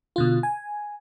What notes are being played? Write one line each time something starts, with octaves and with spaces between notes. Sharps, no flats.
B2 D3 F4
G#5